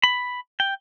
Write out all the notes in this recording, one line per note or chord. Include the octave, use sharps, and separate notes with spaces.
B5
G5